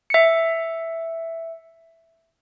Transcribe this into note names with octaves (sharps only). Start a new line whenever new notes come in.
E5 C#7